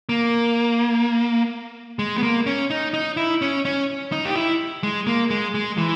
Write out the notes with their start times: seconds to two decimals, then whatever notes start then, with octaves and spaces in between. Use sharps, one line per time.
0.09 A#3
1.99 G#3
2.18 B3
2.23 A#3
2.46 C#4
2.70 D#4
2.94 D#4
3.17 E4
3.42 C#4
3.65 C#4
4.12 D#4
4.25 G4
4.35 E4
4.83 G#3
5.07 A#3
5.30 G#3
5.55 G#3
5.78 E3